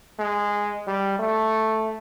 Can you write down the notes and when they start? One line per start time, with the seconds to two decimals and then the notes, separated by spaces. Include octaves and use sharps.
0.19 G#3
0.87 G3
1.19 A3